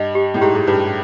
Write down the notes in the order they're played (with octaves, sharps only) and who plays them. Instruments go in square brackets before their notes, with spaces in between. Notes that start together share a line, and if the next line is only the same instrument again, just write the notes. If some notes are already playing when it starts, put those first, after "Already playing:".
Already playing: [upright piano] G2 [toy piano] D#5
[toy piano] G4
[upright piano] A2
[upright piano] G#2 [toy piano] G4
[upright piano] G#2
[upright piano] G2 [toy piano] B4